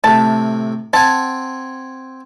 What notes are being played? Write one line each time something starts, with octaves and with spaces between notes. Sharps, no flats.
A2 C3 A5
C4 F#5 G#5 A5